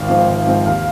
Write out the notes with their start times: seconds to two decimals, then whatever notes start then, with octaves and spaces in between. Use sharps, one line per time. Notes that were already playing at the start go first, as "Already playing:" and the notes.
Already playing: G#1 F5
0.08 G#2 F3 C4
0.28 G#1
0.47 G#2 F3 C4
0.65 D#2 F5